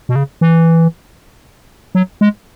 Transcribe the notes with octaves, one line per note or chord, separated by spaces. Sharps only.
B2
C#3
E3
F#3
G#3